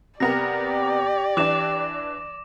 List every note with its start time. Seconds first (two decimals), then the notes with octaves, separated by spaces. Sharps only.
0.20 C3 B3 G4 A#4 D5 A#6
1.37 E3 D4 D6 E7